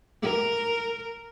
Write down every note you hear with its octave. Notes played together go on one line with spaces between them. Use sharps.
A#4